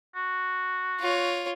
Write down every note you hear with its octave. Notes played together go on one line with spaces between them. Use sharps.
F#4
F4 C#5